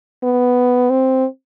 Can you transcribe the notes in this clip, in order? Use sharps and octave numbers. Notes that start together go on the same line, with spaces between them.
B3
C4